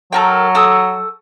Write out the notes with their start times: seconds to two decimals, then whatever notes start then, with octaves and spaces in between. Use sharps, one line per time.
0.13 F#3 A4 A#4 G5
0.55 A4 D#6 E6